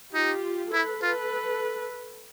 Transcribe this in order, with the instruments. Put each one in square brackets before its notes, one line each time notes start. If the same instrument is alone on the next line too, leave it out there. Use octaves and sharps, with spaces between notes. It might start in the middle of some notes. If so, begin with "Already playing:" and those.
[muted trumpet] D#4 [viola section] F4 G4
[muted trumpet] E4 [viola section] A4 B4
[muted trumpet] F4 [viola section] A4 B4